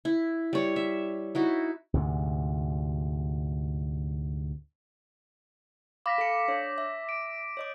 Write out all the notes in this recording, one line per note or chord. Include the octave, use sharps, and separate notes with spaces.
E4
G3 C#5
E5
D#4 E4 F#4
D2 G#2 C3
F5 B5 D6 A#6 B6
A4 F5 C#7
D4 C#5
E5
D7
C#5 D#5 D6